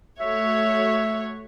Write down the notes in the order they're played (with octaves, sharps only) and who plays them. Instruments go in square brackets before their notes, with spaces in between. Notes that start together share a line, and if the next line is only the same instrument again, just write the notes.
[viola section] A3 F#4 C#5 [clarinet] E5